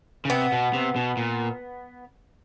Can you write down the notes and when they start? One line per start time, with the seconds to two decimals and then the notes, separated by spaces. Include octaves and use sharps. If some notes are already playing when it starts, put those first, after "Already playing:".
0.25 C#3
0.30 C3 B3
0.52 B2
0.74 C3
0.96 B2
1.17 A#2